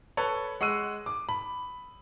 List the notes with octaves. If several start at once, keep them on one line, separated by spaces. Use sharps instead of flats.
A4 B4 C#5
G#3 F#5 C#6 E6 D#7
D6
B5